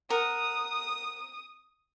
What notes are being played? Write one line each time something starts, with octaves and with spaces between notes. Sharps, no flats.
A#4 F#5 D#6